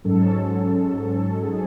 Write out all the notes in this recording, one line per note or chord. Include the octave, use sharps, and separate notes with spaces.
G#2 F#3 C#4 A4
G#4